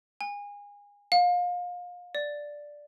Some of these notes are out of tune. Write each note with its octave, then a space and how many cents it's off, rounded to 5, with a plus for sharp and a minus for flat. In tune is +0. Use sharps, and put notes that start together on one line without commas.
G#5 -30
F5 +30
D5 +0